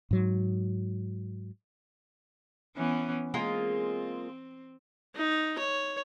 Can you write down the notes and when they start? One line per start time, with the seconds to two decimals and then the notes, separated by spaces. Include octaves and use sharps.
0.11 G#2 F#3
2.76 E3 B3 C#4
3.34 G#3 A#3 C4 F4
5.16 D#4
5.58 C#5